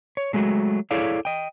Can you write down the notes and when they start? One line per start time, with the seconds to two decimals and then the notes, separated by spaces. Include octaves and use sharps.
0.17 C#5
0.33 F#3 G#3 A3 F#4
0.91 E4 G#4 A4 C#5 D5 F5
1.25 D#5 G5